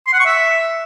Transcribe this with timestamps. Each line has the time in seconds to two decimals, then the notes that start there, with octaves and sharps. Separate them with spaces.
0.07 C6
0.13 F#5
0.20 C#6
0.26 E5